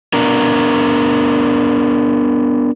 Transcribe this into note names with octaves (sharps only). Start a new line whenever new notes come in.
B3 D4 A#4